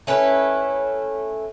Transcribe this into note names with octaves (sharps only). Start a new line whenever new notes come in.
A3 C#4 E4 B4